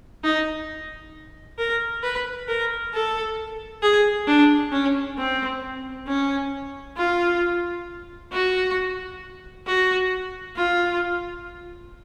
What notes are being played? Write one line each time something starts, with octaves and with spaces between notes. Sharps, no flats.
D#4
A#4
B4
A#4
A4
G#4
D4
C#4
C4
C#4
F4
F#4
F#4
F4